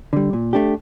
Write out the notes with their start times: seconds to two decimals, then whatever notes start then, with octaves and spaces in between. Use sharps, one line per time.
0.13 D3 G3
0.33 A#2
0.53 A3 D4 G4